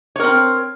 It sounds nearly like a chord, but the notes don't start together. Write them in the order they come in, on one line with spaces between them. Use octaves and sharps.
C#5 A#4 C4